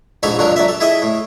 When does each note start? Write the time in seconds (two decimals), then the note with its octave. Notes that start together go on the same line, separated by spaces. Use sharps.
0.23 A#1 G#2 D#4 A4 C#5 B5
0.39 A#1 F2 D3 F#3 D4 A#4
0.56 F#3 D5 E5
0.68 A4
0.80 E4 G#4 D#5 E5
1.02 A2